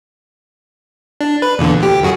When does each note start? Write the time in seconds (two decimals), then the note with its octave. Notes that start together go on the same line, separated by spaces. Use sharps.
1.21 D4
1.42 B4
1.58 E2 A#2 D3
1.80 D2 G4
2.03 F#2 F#4 G#4